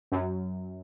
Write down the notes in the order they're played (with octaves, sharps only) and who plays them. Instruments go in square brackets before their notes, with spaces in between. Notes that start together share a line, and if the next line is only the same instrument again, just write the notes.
[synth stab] F#2